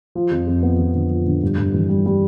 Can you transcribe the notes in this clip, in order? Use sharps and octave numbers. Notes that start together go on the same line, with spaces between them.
F3
F2
F2
B3
F2
D3
F3
D3
G2
G2
E3
G3
G3